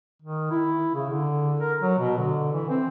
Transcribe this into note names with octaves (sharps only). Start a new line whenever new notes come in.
D#3
E4
C#3
D3
A#4
F#3
B2
D3
E3
C4